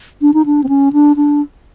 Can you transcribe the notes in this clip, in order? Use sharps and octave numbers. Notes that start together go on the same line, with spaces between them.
D4
D#4
D4
C4
C#4
D4
D4